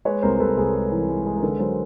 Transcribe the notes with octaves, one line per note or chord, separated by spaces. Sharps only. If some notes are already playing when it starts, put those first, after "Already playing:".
G#3 B4 C#5
C2 A#4 C5
C2 A4 B4
C2 G#4 A#4
G#3
E3
G#3
G#3
A#4
D3 A4 B4
F#3 A#4 C5